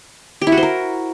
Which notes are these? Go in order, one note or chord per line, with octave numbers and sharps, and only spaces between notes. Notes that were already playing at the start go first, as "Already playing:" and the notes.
G4
E4
F#4
C5
A#4